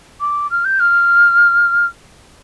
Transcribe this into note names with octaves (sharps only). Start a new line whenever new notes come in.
D6
F6
G6
F6